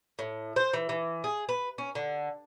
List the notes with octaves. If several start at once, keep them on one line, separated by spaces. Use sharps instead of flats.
A2
C5
E3
E3
G#4
B4
C#4
D3